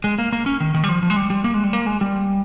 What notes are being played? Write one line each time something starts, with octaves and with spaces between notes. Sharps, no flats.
G#3
A#3
A#3
C#4
D#3
D#3
G3
F3
F3
G#3
G3
G3
A#3
G#3
G3
A#3
G#3
G3